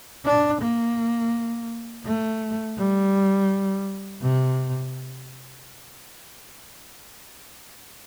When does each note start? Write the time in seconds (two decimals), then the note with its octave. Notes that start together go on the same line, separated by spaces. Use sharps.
0.25 D4
0.61 A#3
2.05 A3
2.78 G3
4.22 C3